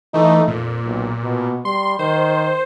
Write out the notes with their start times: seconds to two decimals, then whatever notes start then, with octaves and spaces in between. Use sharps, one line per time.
0.14 E3 A3 D#4
0.48 F2 A#2
0.85 B1
1.23 B2
1.65 G3 C6
1.99 D#3 C5